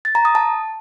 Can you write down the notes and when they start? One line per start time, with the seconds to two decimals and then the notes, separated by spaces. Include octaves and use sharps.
0.05 A6
0.15 A#5
0.25 D#6
0.35 A5